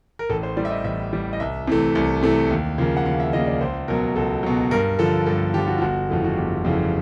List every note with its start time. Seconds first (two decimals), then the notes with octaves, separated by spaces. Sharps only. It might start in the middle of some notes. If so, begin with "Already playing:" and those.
0.19 A#4
0.30 A1 A4
0.43 C5
0.57 A2 E3 G3 D5
0.65 E5
0.71 D#5
0.84 A1 E5
1.12 A2 E3 G3
1.33 D#5
1.40 C2 E5
1.68 C3 E3 A3
1.95 C2
2.23 C3 E3 A3
2.51 D#2
2.78 C#3 F3 A#3
2.97 F#5
3.06 D#2 F5
3.20 E5
3.33 C#3 F3 A#3 D#5
3.47 D5
3.61 C#2 C5
3.88 B2 F#3 A#4
4.16 C#2 A4
4.43 B2 F#3
4.71 G2 A#4
4.99 D3 F3 A4
5.26 G2 A4
5.54 F3 G4
5.58 D3
5.68 F#4
5.78 F4
5.82 G1 F#4
6.09 F2 C#3 E3 A3 F4
6.24 F#4
6.37 G1 G4
6.64 F2 C#3 E3 A3